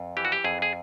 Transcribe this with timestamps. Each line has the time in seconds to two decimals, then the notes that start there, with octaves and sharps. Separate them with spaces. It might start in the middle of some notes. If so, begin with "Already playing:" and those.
Already playing: F2
0.17 E3 G4
0.25 F#4
0.32 G4
0.44 F2 G#4
0.62 G#4